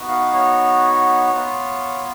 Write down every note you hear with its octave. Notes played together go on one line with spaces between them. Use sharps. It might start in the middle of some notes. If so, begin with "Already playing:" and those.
Already playing: B3 D#4 F#4
F5
C#5
B3 F4